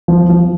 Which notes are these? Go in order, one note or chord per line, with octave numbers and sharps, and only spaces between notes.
F3
F3